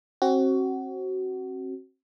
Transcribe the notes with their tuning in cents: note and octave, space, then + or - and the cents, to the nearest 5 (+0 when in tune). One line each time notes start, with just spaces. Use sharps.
C4 +35 F#4 +20